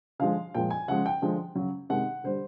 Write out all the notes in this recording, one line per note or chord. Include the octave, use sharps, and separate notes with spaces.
D3 F3 G#3 F5
A#2 F3 G#3 G5
G#5
C#3 F3 G#3 F#5
G5
D3 F3 G#3
C#3 F#3
C3 D#3 G#3 F#5
D3 G3 C5